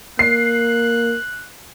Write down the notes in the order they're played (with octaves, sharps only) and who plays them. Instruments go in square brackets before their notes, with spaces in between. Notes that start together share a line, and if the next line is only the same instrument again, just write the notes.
[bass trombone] A#3 [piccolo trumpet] F#6 [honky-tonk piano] C7